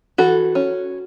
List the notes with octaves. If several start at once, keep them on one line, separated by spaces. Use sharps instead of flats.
E3 F#4 A4
C#4